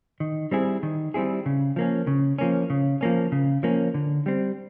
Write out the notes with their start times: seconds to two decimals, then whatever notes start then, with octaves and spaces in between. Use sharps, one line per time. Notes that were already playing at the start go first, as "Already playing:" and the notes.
0.20 D#3
0.51 G3 C4 E4 G#4
0.83 D#3
1.14 G3 C4 E4 G#4
1.46 C#3
1.76 F3 A#3 C#4
2.07 C#3
2.38 F3 A#3 C#4
2.70 C#3
3.01 F3 A#3 C#4
3.32 C#3
3.63 F3 A#3 C#4
3.94 D3
4.26 G3 C4